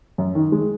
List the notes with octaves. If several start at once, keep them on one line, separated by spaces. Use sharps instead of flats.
F#2
D#3
G#3